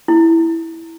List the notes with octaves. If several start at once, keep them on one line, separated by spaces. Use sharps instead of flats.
E4